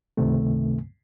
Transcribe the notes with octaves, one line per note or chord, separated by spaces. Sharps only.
C#2 G2 C3 D#3 A3